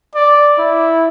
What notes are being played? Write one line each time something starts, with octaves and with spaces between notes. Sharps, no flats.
D5
E4